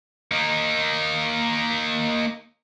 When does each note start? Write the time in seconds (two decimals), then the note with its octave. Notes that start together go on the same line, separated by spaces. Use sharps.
0.32 A#3 D#4